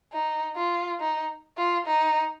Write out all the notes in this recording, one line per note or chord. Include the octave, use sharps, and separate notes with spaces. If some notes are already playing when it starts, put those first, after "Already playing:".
D#4
F4
D#4
F4
D#4